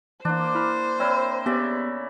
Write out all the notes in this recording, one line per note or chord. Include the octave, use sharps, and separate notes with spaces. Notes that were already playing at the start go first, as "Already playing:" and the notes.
E3 A#3 D4 C5
E4 B5 F6
C4 E4 A#4 C#5 D5 C6
C#3 B3 G4 D5 E5